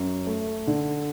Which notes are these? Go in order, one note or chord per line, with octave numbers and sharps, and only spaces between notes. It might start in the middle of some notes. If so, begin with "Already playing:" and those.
Already playing: F#2
A3
D3